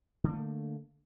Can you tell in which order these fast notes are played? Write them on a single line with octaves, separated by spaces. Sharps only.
D3 A#3 A3